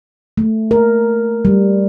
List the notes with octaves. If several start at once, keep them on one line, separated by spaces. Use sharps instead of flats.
A3
A#4
G3